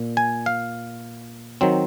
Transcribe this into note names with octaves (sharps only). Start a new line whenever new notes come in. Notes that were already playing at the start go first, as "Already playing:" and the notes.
Already playing: A#2
G#5
F5
D#3 F#3 C4